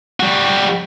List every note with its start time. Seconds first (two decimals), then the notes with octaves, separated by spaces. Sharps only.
0.20 G3 F#4